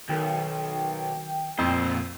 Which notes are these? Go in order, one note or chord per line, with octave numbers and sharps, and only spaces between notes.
B1 D#3 A#4 G5
F2 A#2 C5 E6